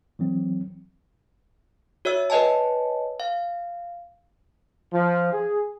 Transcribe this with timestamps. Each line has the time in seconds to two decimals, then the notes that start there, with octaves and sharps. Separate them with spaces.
0.19 E3 F#3 C4
2.05 F#4 C#5 E5 E6
2.30 B4 C#5 D#5 G#5 A5
3.20 F5
4.93 F3
5.33 G#4